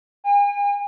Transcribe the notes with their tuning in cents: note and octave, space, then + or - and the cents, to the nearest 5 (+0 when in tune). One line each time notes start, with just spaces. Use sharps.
G#5 -45